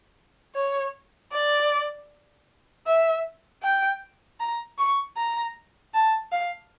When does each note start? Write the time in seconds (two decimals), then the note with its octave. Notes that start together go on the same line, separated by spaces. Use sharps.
0.55 C#5
1.32 D5
2.86 E5
3.63 G5
4.40 A#5
4.78 C#6
5.16 A#5
5.94 A5
6.32 F5